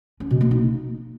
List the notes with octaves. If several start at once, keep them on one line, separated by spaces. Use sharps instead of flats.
C#4
B2
A#3
D#4